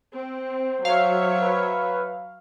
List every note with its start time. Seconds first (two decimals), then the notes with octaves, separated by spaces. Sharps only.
0.15 C4 C5
0.85 F#3 C#5 E5 F5
1.41 B4